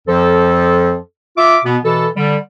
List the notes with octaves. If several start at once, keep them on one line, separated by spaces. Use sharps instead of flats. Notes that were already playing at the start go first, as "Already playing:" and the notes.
F2 F3 A4
F4 E5 D6
B2 B3
B2 E3 A4
D3 G3